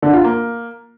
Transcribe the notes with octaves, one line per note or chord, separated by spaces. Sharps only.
D3
F4
A#3